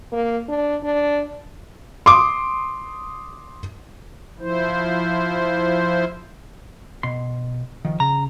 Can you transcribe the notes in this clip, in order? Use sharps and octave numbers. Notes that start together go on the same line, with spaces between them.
A#3
D4
D4
C6 D6 D#6
F3 E4 C5
B2 C6
D#3 F3
C#3 A#5